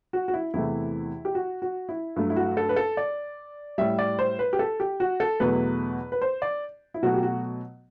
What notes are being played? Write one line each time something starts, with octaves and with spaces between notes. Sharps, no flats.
F#4
F#4
E4
E2 C3 E3 A3 E4
G4
F#4
F#4
E4
G2 F#3 A3
E4
F#4
A4
B4
A4
D5
A2 G3 E5
D5
C5
B4
G4
A4
G4
F#4
A4
E2 B2 F#3 A3 B4
B4
C5
D5
E4
B2 F#3 A3 F#4
G4
F#4